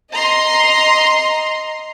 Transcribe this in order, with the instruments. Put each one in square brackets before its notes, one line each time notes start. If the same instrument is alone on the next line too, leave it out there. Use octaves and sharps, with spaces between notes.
[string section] D#5 A#5 C6